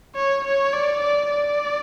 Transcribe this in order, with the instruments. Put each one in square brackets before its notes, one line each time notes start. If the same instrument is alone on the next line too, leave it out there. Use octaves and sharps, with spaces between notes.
[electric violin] C#5
C#5
D5
D5
D5